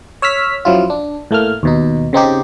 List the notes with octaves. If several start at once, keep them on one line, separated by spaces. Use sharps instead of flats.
C#5 E6 F6 B6
F#2 F3 F#3 E4 F4
D4
A2 A3 A#3 F6
D#2 B2 D#4
C#3 C4 D#4 G4